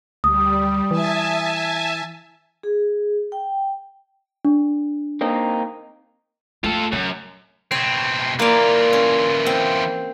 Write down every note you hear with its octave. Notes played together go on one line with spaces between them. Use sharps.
D2 G3 D#6
E3 E5 G#5 A5
G#4
G5
D4
A#3 C4 D#4
A3 F4 A4
F#2 C#3
B2 C4 C#5
E3 A#3 F4 D5
C#4
C4